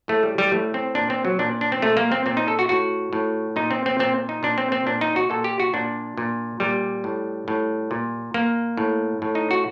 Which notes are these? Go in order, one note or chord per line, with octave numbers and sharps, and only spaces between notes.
A2 A3
G3
G3
A2 A3
C4
A#2 D4
C4
F#3
A#2 D4
D4
C4
A#2 A3
A#3
C4
A#2 C4
D#4
A4
F#4
A2 F#4
A2
A#2 D#4
C4
C4
A#2 C4
D#4
A#2 D4
C4
C4
A#2 D4
D#4
F#4
A#2 A4
G4
F#4
A#2 D4
A#2
A#2 G3
A2
A2
A#2
A#2 A#3
A2
A2
D#4
F#4